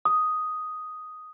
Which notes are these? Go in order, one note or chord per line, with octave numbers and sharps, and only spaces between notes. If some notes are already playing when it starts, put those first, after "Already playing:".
D#6